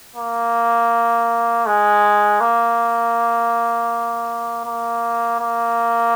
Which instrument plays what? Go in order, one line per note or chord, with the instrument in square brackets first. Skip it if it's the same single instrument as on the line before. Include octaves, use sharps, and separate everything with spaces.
[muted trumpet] A#3
G#3
A#3
A#3
A#3